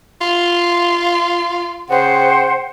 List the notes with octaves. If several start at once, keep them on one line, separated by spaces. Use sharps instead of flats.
F4
C#3 C5 F#5 G5